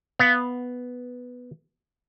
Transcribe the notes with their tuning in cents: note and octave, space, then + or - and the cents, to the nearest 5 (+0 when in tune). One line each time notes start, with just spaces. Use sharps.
B3 +0 F5 +0